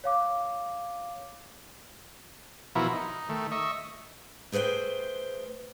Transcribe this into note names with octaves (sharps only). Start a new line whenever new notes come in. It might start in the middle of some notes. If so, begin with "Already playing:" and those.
C#5 F5 D6
B2 E3 F3 E4 F#4 A#4
D#4
D#3 A3
D#5 E5 C#6
A3 G#4 B4 C5 G5